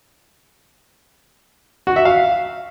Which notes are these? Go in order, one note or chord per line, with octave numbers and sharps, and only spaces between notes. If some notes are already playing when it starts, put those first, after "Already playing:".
F#4
E5
F5